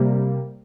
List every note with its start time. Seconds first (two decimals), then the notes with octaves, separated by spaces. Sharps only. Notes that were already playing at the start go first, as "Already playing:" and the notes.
Already playing: C3 G3 A#3